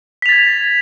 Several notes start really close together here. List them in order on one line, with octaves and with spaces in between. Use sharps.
B6 F7 A6 G#6